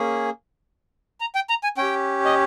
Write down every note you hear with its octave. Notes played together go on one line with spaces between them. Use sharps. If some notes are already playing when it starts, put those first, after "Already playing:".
Already playing: A#3 C#4 G#4
A#5
G5
A#5
G#5
C#4 G4 G5
D#5